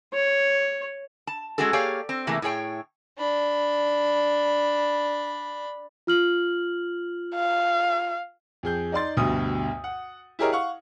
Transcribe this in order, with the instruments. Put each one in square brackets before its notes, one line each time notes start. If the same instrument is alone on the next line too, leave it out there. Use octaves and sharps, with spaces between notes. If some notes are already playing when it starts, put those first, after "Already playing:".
[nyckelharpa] C#5
[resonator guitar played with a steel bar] A5
G#3 C#4 F#4 G#4 A4
A#3 G4 G#4 C#5 D5 F5
C4
C3 E3 A3 A#3 G#4
A2 E4 G#4 C#5 G5
[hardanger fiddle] D4 B5
[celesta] F4 F6 F#7
[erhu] F5
[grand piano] F2 G#4 G6
D#4 D5 C6 A6
D2 G2 B2 D#6
F#5
E4 G4 G#4 A#4 C#5 D#5
F5 F#5 C#6